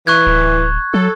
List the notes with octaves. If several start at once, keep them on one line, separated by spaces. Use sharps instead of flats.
E3 C#6 F#6 G#6
D1
F#3 A4